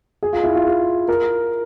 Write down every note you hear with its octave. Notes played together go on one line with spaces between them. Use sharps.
G#4
F4
E4
F4
G#4
A#4